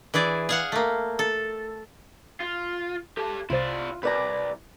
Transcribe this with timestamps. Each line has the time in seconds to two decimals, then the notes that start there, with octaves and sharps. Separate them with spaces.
0.14 E3 E4 G#4 D5
0.49 G#4 F5 F#5
0.72 A3 A#3
1.19 A4
2.40 F4
3.17 G4 A4 A5
3.50 C2 C3 E4 F4 C5 D5
4.03 C2 A#4 B4 D5 A#5